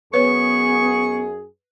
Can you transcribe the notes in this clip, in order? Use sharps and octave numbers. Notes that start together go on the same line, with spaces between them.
F#2 B3 G#4 B4 C#5 C#6